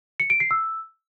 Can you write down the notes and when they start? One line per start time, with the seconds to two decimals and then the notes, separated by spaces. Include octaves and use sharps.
0.20 C#7
0.30 D7
0.40 C7
0.51 E6